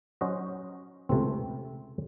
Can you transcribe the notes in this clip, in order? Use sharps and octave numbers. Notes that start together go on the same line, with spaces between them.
F#3 C#4 F#4 C5 D#5
C#2 C3 E3 A3 C4